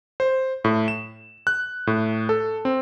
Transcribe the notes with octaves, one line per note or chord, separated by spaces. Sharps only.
C5
A2
E7
F#6
A2
A4
C4